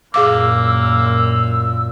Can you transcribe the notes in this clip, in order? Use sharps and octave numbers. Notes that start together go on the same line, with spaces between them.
F#2 A#2 A#3 G#4 F5 D6 E6